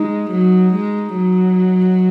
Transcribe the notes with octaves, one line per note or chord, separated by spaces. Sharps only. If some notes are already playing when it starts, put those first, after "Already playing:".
Already playing: G#3 D#4
F#3
G#3
F#3